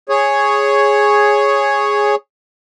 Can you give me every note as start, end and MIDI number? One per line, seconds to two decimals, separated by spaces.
0.09 2.15 68
0.09 2.15 73